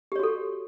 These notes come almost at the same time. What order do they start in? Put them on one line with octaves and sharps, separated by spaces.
G4 C#5 F#4 A4